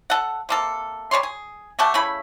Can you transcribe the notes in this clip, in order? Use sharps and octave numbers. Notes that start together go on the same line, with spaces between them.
A4 F#5
C3 A#3 A4
G3 A4 C#5 C6
G#4
A3 F#4 G4 A5
C#3 A3 E4 B5